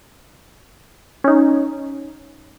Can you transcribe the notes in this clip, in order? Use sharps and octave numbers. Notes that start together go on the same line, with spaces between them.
C#4 D#4